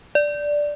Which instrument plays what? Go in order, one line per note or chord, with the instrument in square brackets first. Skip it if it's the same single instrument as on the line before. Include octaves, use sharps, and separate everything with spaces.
[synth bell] D5